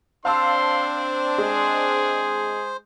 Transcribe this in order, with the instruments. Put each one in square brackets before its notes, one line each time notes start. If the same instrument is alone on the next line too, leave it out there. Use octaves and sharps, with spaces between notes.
[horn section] C4 D4 [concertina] C5 [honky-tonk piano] F5 A5 E6 [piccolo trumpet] C6
[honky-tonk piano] G#3 [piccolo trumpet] G#4